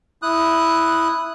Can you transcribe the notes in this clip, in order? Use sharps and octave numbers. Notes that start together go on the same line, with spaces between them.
E4 D#6 F#6